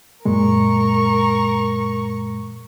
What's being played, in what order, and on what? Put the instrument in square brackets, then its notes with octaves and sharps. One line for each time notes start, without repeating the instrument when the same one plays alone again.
[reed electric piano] F#2 A#2 G#3 [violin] A#4 C#6